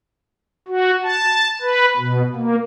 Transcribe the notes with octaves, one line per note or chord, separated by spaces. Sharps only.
F#4
A5
B4
B2
A#3